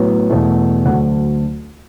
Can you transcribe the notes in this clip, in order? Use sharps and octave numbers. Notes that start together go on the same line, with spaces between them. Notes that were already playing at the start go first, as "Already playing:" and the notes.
Already playing: A2 F#3 B3
E2 B2 A3
D2 D3 F#3 F#5